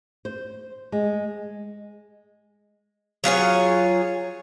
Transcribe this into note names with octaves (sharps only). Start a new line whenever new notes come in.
C5
G#3
F#3 F4 G#4 C#5